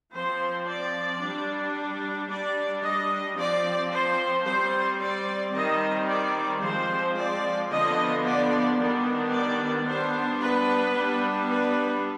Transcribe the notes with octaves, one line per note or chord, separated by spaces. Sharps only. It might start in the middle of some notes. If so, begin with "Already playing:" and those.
F3 C4 C5
D5
G3 D4
G3 D4 D5
D#5
F3 C4 D5
C5
G3 C4 C5
D5
D#3 G3 C4 D#5
D5
F3 G#3 C4 C5
D5
D3 F3 B3 D4 D#5
D5
D#3 G3 B3 D4
D5
G3 B3 D4 C5
B4
G3 B3 D4
B4